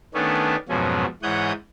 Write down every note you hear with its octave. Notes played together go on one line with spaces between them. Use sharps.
D#3 A3 B3 C#4 D4
F2 G#2 B2 F3 F#3 C#4
G#2 E3 C#5 F#5 D#6 G6